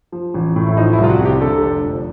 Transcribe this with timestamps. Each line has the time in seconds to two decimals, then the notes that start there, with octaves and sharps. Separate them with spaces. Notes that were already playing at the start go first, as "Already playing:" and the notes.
0.12 F3
0.34 A1
0.56 A2
0.67 E4
0.77 F3 D#4
0.93 E4
0.98 C2
1.04 F4
1.09 F#4
1.20 C3
1.25 G4
1.41 D3 A4
1.63 F1
1.85 F2